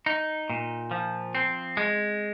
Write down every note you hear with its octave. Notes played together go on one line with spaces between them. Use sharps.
D#4
A#2
F3
C4
G#3